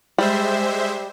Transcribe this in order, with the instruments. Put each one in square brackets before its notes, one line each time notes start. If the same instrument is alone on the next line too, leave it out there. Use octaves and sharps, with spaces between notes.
[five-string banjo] G3 [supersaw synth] G#3 C5 E5